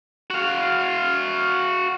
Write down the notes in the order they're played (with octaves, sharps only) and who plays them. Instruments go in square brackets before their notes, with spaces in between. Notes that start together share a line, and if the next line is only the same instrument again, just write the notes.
[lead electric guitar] F#4 F5